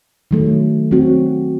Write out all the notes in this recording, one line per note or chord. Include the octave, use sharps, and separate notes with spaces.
D#3 F#3 A3
F#3 C4 F#4